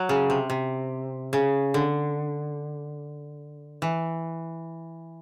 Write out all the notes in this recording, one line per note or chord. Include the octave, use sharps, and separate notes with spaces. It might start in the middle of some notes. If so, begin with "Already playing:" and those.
Already playing: F#3
C#3
C3
C3
C#3
D3
E3